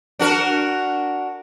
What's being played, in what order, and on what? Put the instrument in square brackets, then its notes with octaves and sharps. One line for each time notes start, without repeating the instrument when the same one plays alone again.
[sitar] D4 F#4 A#4